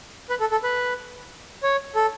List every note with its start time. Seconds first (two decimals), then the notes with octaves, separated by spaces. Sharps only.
0.30 B4
0.40 A4
0.52 A4
0.64 B4
1.63 C#5
1.95 A4